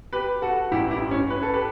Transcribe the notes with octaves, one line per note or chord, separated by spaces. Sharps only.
G4 B4
F#4 A4
A1 G2 E3 E4 G4
E4 G4
C#4
B4
A4
G4 B4